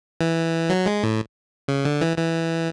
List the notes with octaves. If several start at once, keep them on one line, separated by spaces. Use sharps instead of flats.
E3
F#3
G#3
A2
C#3
D3
E3
E3